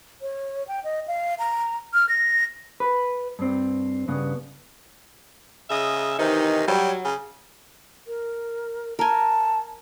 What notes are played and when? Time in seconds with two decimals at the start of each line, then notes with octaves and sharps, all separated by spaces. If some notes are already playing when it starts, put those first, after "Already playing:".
0.22 C#5
0.68 G5
0.84 D#5
1.08 F5
1.39 A#5
1.94 F6
2.09 A#6
2.80 B4
3.39 G2 C4
4.08 G2 C#3 B3
5.70 C#3 D#5 E5
6.19 C3 D#3 E3 D#4
6.67 F#3 G3
7.05 C#3
8.07 A#4
8.99 A#4 G#5 A5